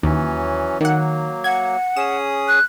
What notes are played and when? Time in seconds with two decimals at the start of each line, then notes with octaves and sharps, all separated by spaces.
0.03 D#2 E3 F#3 C#4
0.81 D#3 F#3 A#3 F#5
1.44 F#5 G#6
1.97 C#4 G#4 D#6 E7
2.48 F#6